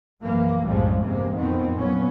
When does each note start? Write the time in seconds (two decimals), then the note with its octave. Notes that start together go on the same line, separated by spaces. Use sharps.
0.22 A#1 F#2 E3 A#3
0.63 C2 F#2 A2 F3 G3 G#3
1.03 A1 E2 G2 C3 G#3 A#3
1.35 F2 B2 D#3 B3 C4
1.76 A#2 F#3 B3 C#4